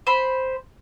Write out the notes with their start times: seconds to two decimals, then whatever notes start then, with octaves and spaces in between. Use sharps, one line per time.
0.07 C5 B5